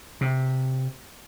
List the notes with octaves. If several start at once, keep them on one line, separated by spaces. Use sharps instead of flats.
C3